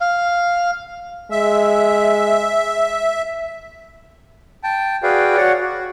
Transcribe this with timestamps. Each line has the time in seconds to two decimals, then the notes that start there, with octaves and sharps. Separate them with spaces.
0.01 F5
1.31 G#3 E5
4.64 G5 A5
5.03 F#4 G#4 B4 D5 F5 G5
5.37 F#4 C#5 D5 F#5
5.61 F#4